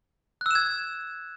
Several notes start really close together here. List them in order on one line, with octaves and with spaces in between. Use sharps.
F#6 E6 E7 G#6